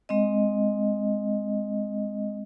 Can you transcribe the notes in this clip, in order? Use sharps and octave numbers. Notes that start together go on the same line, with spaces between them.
G#3 C4 D#5